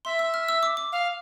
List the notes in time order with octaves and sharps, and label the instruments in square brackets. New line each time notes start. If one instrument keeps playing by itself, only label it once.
[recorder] E5 [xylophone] C6
[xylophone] E6
F6
E6
D6
D6
[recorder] F5